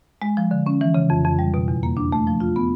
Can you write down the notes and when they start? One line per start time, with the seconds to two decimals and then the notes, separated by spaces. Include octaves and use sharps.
0.22 G#3
0.37 F3
0.51 D3
0.67 C#4
0.81 E3
0.95 C#3
1.10 F2
1.25 F2
1.39 G3
1.54 B2
1.68 E2
1.83 A#3
1.97 D4
2.12 A3
2.27 F3
2.40 F4
2.56 B3